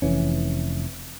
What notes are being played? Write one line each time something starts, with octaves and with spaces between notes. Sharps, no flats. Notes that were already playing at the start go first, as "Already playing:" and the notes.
F1 E3 C#4